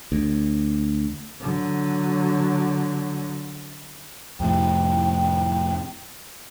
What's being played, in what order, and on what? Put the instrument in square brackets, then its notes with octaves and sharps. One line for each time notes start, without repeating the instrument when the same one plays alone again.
[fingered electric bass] D2
[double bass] D3 F#3
[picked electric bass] F2 A2 C3 [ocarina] G5